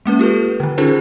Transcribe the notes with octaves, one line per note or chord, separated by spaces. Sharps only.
G#3 A#3 C#4 B4
F4 G4 A4 B4
D3 D#3
C#4 D#4 F4 G#4 A#4 C5